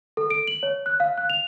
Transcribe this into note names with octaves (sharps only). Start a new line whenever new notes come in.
A4
D7
F#7
C#5
F#6
F5
F#6
F7